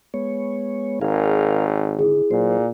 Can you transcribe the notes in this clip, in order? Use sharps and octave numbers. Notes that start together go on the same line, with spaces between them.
G#3 B3 C#5
G#1 G#4 A#4 F5
D3 E4 G#4
A#2 F#3 C5